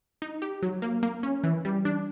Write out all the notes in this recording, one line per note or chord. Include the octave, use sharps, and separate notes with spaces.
D#4
G4
F#3
A#3
A#3
C#4
E3
G3
D4